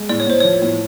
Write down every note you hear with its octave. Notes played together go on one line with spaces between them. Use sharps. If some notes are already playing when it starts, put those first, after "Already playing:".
Already playing: G#3
A2 D5
C#5
A2 C5
F3 C#5
A2